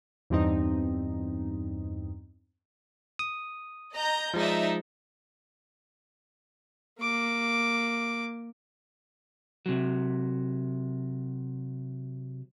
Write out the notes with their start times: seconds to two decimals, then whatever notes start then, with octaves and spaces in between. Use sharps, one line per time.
0.30 E2 G2 C4 D#4
3.19 D#6
3.93 D#5 A#5 G6
4.34 F3 G#3 D#4 D5 E5
7.00 A#3 D6
9.66 C3 F#3